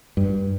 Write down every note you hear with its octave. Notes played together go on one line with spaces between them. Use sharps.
G2